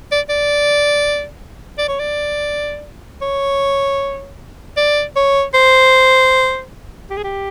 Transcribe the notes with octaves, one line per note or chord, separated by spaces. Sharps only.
D5
D5
D5
C#5
D5
C#5
D5
C#5
C5
G4
G#4
G4